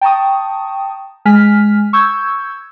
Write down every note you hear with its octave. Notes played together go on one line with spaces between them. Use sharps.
G5 A5 A#5 C#6 D#6
G#3 G#5 F6 B6
C#6 E6 G6 G#6